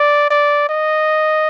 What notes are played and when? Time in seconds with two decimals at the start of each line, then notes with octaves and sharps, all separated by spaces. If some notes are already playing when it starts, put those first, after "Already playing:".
Already playing: D5
0.30 D5
0.69 D#5